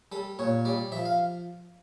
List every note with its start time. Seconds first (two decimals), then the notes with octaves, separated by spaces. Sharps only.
0.12 G3 A4
0.39 A#2 C#5
0.65 G3 D5
0.92 F3 E5
1.05 F5